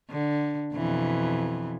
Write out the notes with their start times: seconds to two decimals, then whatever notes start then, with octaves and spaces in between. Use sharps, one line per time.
0.11 D3
0.74 F2 B2 E3